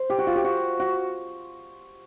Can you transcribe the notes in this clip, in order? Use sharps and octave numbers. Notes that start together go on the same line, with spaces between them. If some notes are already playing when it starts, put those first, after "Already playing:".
Already playing: C5
G4
F#4
F4
G4
F#4
F#4